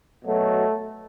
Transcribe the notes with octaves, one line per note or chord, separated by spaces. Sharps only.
B2 F#3 A3